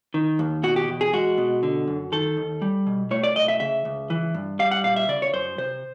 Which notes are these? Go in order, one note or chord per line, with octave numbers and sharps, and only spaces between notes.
D#3
D#2
B2 F#4
G4
E2
G#4
G#3 F#4
B2
D3
F#2
D#3 A4
D#2
G3
B2
A2 C#5
D5
B1 D#5
E5
C#3 E5
C#2
E3
G2
G3 F5
F#5
A#2 F5
E5
C#3 D5
C#5
F#2 C5
C3 C5